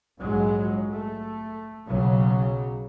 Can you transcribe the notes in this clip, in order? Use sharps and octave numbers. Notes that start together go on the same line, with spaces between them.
A#1 G#2 F#3 G#3
A3
B1 C#3 F#3